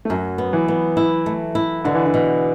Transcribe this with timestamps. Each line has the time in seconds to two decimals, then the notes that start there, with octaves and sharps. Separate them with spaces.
0.05 A3
0.10 F#2 F#3
0.38 B3
0.53 E3
0.68 B3
0.97 E4
1.26 A3
1.55 E4
1.84 B2 D3
1.95 E3
2.06 D3
2.14 B2